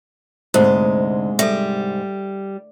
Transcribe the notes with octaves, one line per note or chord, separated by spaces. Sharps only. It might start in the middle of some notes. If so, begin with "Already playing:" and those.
D2 G#2 C3 G#3 C5
G3 A4 E5